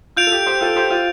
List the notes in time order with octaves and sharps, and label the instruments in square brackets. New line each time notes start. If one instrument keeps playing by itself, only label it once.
[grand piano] F4 [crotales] G6 D7 F7
[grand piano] A4
G4
G4 C5
F4 A4
G4 C5
F4